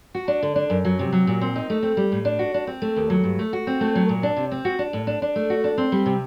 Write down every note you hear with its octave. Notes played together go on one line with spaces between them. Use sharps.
F#4
D4
D3
D4
F#2
F#3
C3
F#3
A#2
C4
D#4
A3
C4
G3
A2
D4
F#4
D4
C4
A3
D#2
F#3
G2
A3
F#4
C4
A3
F#3
A#2
D4
C3
C4
F#4
D4
A2
D4
D4
A3
F#4
D4
C4
G3
C3